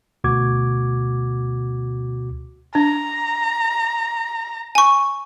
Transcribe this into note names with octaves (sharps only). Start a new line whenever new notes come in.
D2 B2 F#4 D6 G#6
D4 A#5
G#5 C#6